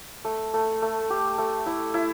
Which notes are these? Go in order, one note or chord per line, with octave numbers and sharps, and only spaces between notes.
A3
A3
A3
G4
A3
E4
E4